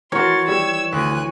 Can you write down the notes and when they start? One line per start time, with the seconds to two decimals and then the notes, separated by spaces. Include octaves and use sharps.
0.12 E3 F#4 A#4 C#5 C6 A6
0.48 G3 E6 G#6
0.93 D2 G#5 F#6